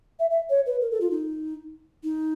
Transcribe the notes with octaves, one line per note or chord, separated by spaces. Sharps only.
E5
E5
C#5
B4
A#4
A4
F4
D#4
D#4